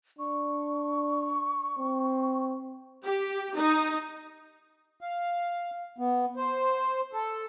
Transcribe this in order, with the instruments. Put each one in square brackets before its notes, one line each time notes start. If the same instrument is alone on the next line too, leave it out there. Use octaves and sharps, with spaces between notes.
[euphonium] D4 [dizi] C#6
[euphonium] C4
[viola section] G4
D#4
[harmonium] F5
B3
C5
A4